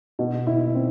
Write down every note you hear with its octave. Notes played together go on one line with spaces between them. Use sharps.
B2
E4
C4